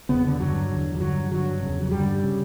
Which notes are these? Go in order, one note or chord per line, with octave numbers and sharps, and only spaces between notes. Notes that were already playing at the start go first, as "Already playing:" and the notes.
E2 C#3 B3
D3
G2 D3 F#3
E2 D3
E3
G2 D3 F#3
G2 D3 F#3
E2 C#3
F#3
G2 D3 G3
C#3